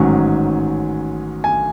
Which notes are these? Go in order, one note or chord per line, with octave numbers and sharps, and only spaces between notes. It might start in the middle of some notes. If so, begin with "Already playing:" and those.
Already playing: A1 G#2 D#3 F#3 C#4 G#5
G#5